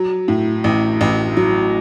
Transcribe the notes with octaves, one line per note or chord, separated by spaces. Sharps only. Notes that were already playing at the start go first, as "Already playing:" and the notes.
Already playing: F#3
A2
A1
A1
F#3